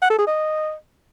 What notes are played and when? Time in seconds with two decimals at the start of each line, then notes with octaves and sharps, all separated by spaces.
0.02 F#5
0.10 A4
0.18 G#4
0.27 D#5